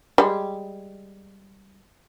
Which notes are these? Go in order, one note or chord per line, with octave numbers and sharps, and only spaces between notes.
G3 G#3